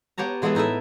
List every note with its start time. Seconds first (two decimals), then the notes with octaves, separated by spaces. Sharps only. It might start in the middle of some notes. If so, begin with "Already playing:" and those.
0.18 B3 G4 C#5 A5 A#5
0.42 E3 G#3 B3 G#4 A4 B4
0.55 A2 D#4 E4 A4 E5